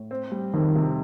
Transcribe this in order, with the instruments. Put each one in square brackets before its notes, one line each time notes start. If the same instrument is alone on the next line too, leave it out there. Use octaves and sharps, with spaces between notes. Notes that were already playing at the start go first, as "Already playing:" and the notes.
Already playing: [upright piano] A2
C4
G3
[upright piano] F2 [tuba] D#3
[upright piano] C3